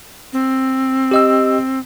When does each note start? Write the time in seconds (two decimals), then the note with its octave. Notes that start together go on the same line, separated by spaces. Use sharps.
0.33 C4
1.11 G4 D#5 E6